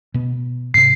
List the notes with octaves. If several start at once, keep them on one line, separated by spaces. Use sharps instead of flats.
B2 B3
G#2 C3 C7